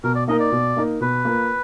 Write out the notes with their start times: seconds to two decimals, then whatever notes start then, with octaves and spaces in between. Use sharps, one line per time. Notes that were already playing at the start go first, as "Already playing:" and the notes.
0.04 B2 A#4
0.15 D5
0.28 A#3 D#4 A#4 D#5
0.40 D5
0.52 B2
0.77 A#3 D#4 A#4
1.01 B2 B4
1.25 A#3 F4 A#4